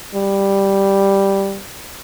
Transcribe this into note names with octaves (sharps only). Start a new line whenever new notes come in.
G3